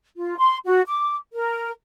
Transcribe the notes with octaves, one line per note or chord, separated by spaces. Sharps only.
F4
C6
F#4
D6
A#4